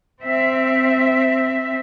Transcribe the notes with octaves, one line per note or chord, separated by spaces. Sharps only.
C4 E5